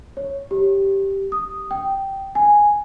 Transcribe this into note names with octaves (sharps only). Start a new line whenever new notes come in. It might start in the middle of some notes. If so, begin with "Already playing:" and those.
C#5
G4
D#6
G5
G#5